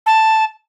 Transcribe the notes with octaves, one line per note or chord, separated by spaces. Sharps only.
A5